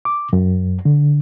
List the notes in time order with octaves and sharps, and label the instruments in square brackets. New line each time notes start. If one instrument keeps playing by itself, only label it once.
[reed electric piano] D6
F#2
D3